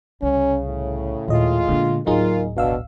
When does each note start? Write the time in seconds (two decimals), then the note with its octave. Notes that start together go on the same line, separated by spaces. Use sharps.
0.22 C2 C#3 C#4
0.67 A2
1.28 D#2 A#2 G#3 F4 D#5
1.68 A#2 D3 B3 D4
2.06 D1 A#2 F#3 D#4 F4 G#4 A#4
2.56 G1 B2 F#3 D4 F5 E6